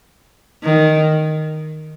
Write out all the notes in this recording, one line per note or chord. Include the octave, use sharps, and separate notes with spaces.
D#3